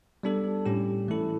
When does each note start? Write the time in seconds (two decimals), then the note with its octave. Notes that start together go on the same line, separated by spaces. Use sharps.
0.23 G3 B3 D4 A4
0.65 A2 G3 C#4 G4
1.08 E3 A3 E4 A4